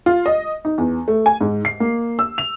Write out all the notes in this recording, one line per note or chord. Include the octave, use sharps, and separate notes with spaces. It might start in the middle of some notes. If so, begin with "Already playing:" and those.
F4
D#5
D#4
E2
A3
G#5
G#2
C7
A#3
E6
F7